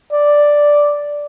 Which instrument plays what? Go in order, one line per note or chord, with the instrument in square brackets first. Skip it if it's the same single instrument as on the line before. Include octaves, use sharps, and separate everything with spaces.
[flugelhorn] D5